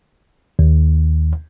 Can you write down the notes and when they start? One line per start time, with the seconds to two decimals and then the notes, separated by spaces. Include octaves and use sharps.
0.59 D#2